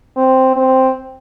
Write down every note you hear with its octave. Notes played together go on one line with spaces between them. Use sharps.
C4
C4